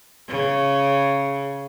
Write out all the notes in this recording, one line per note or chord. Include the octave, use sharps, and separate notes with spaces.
C#3